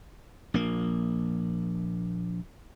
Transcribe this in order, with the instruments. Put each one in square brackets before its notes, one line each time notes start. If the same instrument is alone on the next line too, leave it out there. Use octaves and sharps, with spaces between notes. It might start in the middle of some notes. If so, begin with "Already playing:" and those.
[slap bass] A#1 A#3